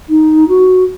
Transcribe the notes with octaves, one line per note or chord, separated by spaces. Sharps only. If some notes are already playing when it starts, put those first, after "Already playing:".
D#4
F#4